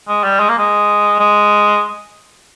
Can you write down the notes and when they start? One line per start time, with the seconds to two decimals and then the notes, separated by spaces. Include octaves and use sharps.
0.08 G#3
0.24 G3
0.40 G#3
0.49 A#3
0.58 G#3
1.20 G#3